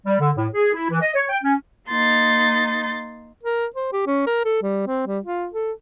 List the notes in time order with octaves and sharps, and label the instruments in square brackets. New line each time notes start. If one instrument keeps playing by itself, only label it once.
[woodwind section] G3
D3
A2
G#4
E4
E3
D#5
C#5
G5
C#4
[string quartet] A#3 D#4 C6 A6
[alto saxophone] A#4
C5
G4
C#4
A#4
A4
G3
C4
G3
F4
A4